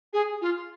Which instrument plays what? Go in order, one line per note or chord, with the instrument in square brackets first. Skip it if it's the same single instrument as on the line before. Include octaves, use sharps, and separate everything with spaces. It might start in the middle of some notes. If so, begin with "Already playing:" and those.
[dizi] G#4
F4